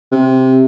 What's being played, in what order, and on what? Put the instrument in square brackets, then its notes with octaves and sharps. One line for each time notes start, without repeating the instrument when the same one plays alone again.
[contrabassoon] C3